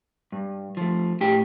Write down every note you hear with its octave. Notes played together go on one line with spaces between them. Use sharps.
G2
F3 A3
A2 G4